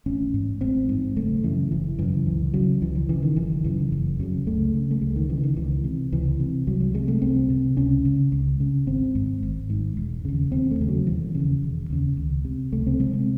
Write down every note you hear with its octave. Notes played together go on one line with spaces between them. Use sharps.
A1 C#4
G#2
A1 C4
G#2
F#1 A3
F#2 C#3 E3
F#1 E3
F#2 C#3 E3
C#2 E3
C#3 F#3
C#2 E3
E3
C#3 E3
D#3
F#1 E3
F#2 C#3 E3
F#1
F#2 C#3
C#2 A3
C#3
A3
C#2 G#3
D#3
C#3 E3
D#3
C#2 E3
C3
C#2 E3
C3
C2 F#3
F#3
C3 G#3
A3
C2 C4
C3
C#2 C#4
C#3
C#2
C#3
G#1 C4
G#2
G#1
G#2
E1
D#2 C#3
E1 C4
A3
D#2 C#3
F#3
E1 E3
D#2 C#3
E1
D#2 C#3
C#2
C3
C#2 A3
C4
C3 G#3
C4